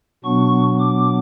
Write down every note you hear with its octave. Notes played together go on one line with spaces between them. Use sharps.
B2 F#3 B3 D4 C#6
D6